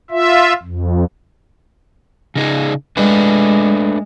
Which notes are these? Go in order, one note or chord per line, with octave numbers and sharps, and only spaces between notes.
F4 E5
F2
C#3 D#4 G#4
G#3 A3 D4 B4